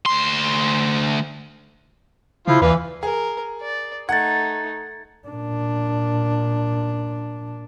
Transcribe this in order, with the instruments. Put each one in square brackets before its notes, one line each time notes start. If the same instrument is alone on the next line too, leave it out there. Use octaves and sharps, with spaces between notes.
[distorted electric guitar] D2 C6
[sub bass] C#3 [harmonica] F3 F4 C6 [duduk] E4
[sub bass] D#2 [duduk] E3 [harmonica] B4 D5 F5
[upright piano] G#4 [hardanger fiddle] A#4
[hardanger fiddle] D5
[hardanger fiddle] A3 D#4 [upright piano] F#5 [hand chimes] G#6 A6
[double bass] A#2 D4